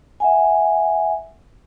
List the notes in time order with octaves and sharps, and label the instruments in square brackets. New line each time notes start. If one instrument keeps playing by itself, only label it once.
[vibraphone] E5 F#5 G#5